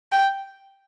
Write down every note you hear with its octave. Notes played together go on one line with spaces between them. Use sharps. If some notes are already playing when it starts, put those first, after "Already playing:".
G5